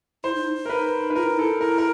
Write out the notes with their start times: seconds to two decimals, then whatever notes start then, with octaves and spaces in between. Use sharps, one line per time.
0.24 E4 C5
0.35 D#4
0.57 D#4
0.65 A#4
0.69 B4
1.10 B4
1.15 F4 A#4
1.23 E4
1.30 D#4
1.37 E4 A4
1.61 E4 A#4
1.78 A#4